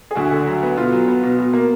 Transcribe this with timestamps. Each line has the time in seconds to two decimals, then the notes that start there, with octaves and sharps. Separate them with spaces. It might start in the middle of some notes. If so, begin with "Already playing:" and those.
0.11 G#4
0.15 D2 F#4
0.31 D3
0.46 F#3
0.63 B3
0.77 B2 F4
0.93 F#3
1.08 B3
1.23 B2
1.39 B2
1.53 A#3